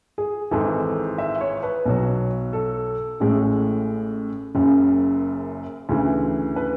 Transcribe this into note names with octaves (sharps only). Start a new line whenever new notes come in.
G#4
G#1 G#2 E3 A4
E5
C#5
B4
B1 B2 F#3
A4
A1 A2 G#3
F#1 F#2 C#3
D2 C#3 E3
B4